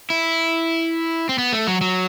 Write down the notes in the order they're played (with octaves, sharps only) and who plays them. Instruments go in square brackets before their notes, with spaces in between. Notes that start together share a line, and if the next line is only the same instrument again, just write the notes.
[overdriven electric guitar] E4
C4
B3
A3
F#3
F#3